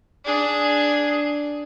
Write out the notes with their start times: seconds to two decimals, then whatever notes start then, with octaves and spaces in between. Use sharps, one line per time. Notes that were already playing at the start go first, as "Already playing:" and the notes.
0.25 D4 G#4